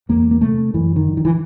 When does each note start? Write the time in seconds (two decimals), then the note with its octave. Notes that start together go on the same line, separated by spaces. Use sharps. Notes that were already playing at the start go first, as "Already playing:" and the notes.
0.09 E2 A#3
0.31 A#3
0.41 C3 A3
0.74 F#2 E3
0.96 D#3
1.06 D3
1.17 D#3
1.25 E3